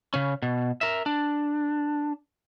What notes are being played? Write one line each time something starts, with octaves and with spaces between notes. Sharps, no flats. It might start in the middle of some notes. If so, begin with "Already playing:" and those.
C#3 C#4
B2
A#4 E5
D4